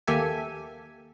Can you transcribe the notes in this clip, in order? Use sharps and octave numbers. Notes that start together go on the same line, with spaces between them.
D#2 A#3 G4 A4 E5 G#5